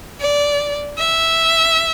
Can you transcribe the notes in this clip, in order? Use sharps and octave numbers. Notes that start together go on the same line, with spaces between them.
D5
E5